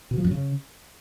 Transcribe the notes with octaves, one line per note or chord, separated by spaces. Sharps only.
B2
F3
F#2
C#3